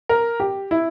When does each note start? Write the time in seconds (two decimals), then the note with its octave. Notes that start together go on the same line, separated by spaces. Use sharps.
0.09 A#4
0.40 G4
0.71 E4